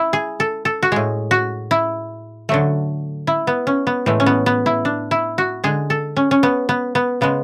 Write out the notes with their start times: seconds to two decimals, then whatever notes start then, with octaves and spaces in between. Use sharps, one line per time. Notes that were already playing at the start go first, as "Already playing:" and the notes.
Already playing: E4
0.13 G#4
0.40 A4
0.65 A4
0.83 F#4
0.92 A2 G#3 G#4
1.31 F#4
1.71 E4
2.49 D3 F#3 A3
3.27 E4
3.47 B3
3.67 C#4
3.87 B3
4.06 A2 E3 G#3 A3
4.20 C#4
4.26 B3
4.46 B3
4.66 E4
4.85 D4
5.11 E4
5.38 F#4
5.64 D3 G#3 G#4
5.90 A4
6.17 C#4
6.31 C#4
6.43 B3
6.69 B3
6.95 B3
7.21 C#3 G#3 B3